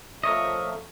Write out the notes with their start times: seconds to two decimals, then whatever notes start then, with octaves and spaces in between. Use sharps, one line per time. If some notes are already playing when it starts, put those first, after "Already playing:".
0.24 F3 A3 A#4 C#5 D#5 E5